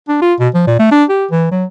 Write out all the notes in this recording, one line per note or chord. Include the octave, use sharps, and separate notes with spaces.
D4
F4
B2
F3
A#2
A3
D4
G4
E3
F#3